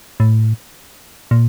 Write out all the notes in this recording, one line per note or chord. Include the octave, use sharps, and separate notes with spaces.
A2
A#2